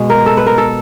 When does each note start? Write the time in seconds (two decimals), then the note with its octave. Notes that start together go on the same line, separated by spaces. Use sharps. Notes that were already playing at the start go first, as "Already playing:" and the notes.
Already playing: B2 G#3
0.10 A#4
0.26 A4
0.37 B4
0.46 A#4
0.58 A4